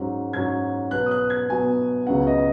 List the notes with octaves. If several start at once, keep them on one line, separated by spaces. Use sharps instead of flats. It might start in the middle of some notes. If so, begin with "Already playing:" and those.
Already playing: G#2 F#3 C#4
G#2 F#3 C#4 G#6
B2 F#3 B3 F#6
D#6
F#6
G#6
B2 F#3 B3 G#5
C#2 C#3 F#3 B3 F#5
D#5